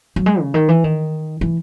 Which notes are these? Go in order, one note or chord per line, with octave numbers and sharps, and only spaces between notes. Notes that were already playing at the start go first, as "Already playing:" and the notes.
F#3
G#3
C#3
D#3
E3
D#3
E3